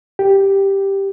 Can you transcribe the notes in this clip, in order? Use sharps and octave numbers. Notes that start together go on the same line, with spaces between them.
G4